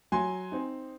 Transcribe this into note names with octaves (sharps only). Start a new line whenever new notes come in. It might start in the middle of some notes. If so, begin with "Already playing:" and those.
F#3 G#5 C6
C4 D#4